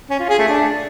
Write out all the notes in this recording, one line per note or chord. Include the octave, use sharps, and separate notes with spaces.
C#4
F4
G#4
A3
D4